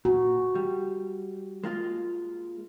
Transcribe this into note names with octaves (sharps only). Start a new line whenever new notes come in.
A#2 F#4
G3
G#3 A#3 F4